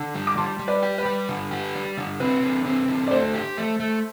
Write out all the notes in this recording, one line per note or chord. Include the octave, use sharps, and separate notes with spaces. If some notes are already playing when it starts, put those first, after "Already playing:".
Already playing: D3
G3
D6
G3 A5 C6
G3
B4 D5
G4
B4
G3
D3
G4
G3
D3
C4 B4
D3
C4
D3
D5
A3 C5
G4
A3
A3